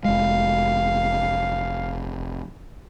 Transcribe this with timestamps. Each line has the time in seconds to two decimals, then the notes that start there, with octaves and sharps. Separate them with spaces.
0.05 F1 G#3 F5